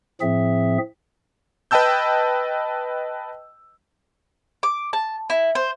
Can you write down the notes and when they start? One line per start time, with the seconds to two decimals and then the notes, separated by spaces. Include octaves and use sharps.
0.21 A2 F3 C4 G#4 E5
1.71 B4 D#5 G5 A5 E6 G6
4.63 D6
4.93 A5
5.30 E4
5.55 C5